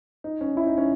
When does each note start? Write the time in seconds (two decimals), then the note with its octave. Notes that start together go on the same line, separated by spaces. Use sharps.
0.24 D#4
0.41 C#4
0.57 E4
0.67 D#4
0.78 C#4